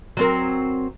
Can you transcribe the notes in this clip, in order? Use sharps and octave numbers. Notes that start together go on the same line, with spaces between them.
F#3 C4 A#4